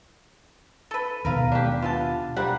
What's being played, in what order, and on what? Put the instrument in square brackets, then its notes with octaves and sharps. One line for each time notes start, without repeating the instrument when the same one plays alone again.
[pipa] A4 B4
[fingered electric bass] D#2 B2 [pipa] A#4 B4 F5
[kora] D4 G4
[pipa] E3 B3 A5 [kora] F4
[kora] G3 [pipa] A#4 C5 F#5